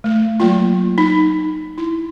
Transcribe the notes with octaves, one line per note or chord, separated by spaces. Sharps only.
A3
F#3 A#3 F4
D#4
E4